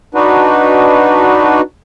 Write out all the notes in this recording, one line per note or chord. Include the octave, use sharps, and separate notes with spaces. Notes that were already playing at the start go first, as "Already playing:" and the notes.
D4 D#4 F#4 B4